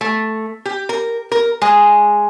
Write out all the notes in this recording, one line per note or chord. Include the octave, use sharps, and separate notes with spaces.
A3
G4
A#4
A#4
G#3